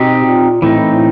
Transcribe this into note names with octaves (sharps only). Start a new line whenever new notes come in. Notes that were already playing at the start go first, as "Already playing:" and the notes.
Already playing: B2 C4 D#4 G4
A#2
A2 E3 A3 C4 D#4
A2